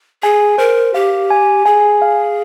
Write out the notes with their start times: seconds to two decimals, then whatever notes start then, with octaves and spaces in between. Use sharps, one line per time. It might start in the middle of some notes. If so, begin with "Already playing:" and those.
0.23 G#4 G#5
0.58 A#4 C5
0.94 G4 F5
1.30 G#5
1.66 G#4 G#5
2.02 F5